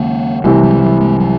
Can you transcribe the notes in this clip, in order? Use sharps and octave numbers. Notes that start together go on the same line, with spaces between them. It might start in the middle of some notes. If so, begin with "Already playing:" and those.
Already playing: D#2 C#3 F#3 G#3 A#3
C2 C3 E3 G3 A3
F#3 G#3
F#3 G#3
G#3 A#3
F#3 G#3